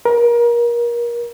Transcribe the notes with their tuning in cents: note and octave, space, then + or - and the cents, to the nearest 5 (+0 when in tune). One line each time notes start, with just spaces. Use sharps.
A#4 +30